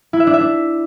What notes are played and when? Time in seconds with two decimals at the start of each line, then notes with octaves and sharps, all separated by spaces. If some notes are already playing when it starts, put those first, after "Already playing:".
0.13 E4
0.20 E5
0.27 D4
0.34 E5
0.40 D4